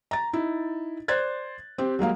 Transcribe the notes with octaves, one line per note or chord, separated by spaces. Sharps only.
A#5 A6
D#4 E4
C5 D5 F#6 G#6 A6
C4 G4
F#3 G#3 A#3 F5